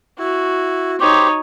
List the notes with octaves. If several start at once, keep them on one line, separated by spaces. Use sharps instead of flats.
E4 F#4
D#4 G4 C5 C#5